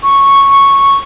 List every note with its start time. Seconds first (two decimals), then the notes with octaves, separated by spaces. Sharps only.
0.03 C#6